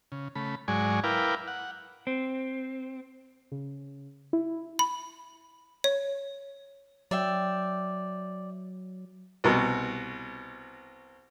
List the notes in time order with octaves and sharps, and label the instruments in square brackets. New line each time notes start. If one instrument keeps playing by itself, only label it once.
[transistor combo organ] C#3
C#3 A3 B5
G#2 F#3 G#3 D5 G#5 C#6
E4 A#4 B4 F5 G5 D6
F#5
[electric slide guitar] C4
[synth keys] C#3
E4
[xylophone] B5
C#5
[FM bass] F#3 [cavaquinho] D5 E5 G5
[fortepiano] C2 B2